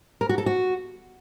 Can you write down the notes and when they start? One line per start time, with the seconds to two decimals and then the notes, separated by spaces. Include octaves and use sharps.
0.21 A#4
0.29 F#4
0.38 A4
0.46 F#4